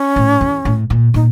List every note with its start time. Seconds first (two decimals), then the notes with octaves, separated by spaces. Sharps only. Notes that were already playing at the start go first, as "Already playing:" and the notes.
Already playing: C#4
0.16 A2
0.41 E2
0.65 A2
0.90 A#2
1.14 A#2 D#4